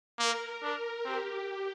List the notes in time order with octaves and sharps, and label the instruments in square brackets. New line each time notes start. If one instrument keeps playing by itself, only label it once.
[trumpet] A#3 [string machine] A#4
[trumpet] D4
[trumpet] C4 [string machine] G4